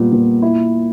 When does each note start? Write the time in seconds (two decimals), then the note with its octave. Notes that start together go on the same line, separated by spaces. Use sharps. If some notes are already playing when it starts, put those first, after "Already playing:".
Already playing: A#2 G3 B3
0.12 A#2
0.42 E4